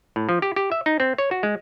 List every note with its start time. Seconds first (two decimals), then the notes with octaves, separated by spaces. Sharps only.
0.16 A2
0.29 F3
0.42 G4
0.56 G4
0.72 E5
0.86 D#4
1.00 C4
1.18 C#5
1.31 F#4
1.43 G#3